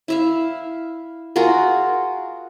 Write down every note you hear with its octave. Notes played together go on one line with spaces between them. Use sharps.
E4 E5 F5
F4 F#4 G#4 A#4